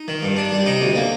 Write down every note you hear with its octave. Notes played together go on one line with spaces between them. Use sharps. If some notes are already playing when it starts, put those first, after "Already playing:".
Already playing: D#4
D#3
G2
D4
G3
C3 D#4
D2
A#3